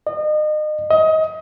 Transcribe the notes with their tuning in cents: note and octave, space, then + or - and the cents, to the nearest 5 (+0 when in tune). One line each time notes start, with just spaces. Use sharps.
D#5 -35
D#5 +25